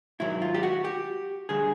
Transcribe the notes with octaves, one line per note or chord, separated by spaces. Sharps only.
G#2 D#3 F#3 E4
F4
G4
F#4
G4
D3 G3 G#4